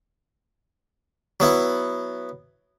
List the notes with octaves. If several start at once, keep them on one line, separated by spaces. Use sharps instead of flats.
F#3 B3 E4